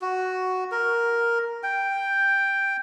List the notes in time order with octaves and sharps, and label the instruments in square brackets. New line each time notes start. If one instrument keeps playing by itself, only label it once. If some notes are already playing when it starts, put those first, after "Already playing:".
[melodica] F#4
A#4
G5